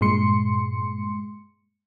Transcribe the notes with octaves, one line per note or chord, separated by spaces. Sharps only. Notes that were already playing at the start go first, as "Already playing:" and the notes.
G2 A#2 G#3 C6 C#7